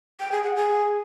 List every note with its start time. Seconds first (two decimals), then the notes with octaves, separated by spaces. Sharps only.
0.20 G5
0.32 G#4
0.44 F#5
0.56 G#4